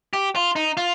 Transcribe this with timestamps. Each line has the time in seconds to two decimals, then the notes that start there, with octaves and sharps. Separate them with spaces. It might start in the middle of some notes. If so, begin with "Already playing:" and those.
0.13 G4
0.35 F4
0.56 D#4
0.77 F4